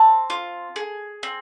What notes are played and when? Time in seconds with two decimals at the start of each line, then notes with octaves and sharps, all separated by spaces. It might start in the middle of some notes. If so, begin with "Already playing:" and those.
Already playing: C4 A5
0.30 F4
0.76 G#4
1.23 C4